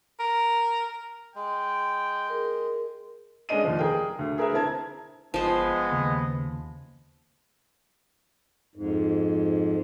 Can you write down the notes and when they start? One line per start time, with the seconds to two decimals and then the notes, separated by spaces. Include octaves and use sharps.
0.20 A#4
1.36 G#3 G5
2.30 G#4 A#4
3.49 G#3 C#4 D4 D#5 D#7
3.64 D#2 F3
3.79 G#4 A#4 G5
4.19 D2
4.38 G#4 A#4 B4 E5
4.52 D3 C4 E4 A#4 A5 G#6
5.34 G1 F3 G#3 B3 C5 D#5
5.92 D#2 C#3
8.75 F2 G#2